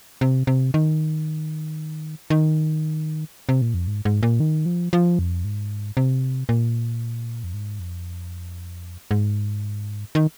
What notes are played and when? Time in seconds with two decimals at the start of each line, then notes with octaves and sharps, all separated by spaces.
0.21 C3
0.47 C3
0.74 D#3
2.30 D#3
3.49 C3
3.62 A#2
3.74 F2
3.87 G#2
4.05 G#2
4.23 A#2
4.40 D#3
4.66 F3
4.93 F3
5.19 F2
5.45 G#2
5.97 C3
6.49 A#2
7.44 F2
7.54 G#2
7.80 F2
9.11 G#2
10.15 D#3